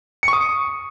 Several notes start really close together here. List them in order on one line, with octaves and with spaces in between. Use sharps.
C#7 C#6 D#6